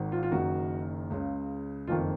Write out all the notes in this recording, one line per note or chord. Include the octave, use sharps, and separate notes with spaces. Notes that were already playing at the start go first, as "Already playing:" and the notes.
Already playing: G#1 G#2 D#3
F4
F4
F#1 F#2 D#3 F#4
C#2 C#3
F#1 F2 D#3 F4